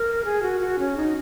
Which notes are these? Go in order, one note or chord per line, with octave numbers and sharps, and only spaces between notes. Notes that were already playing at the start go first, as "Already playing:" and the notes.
Already playing: A#4
G#4
F#4
F#4
C#4
D#4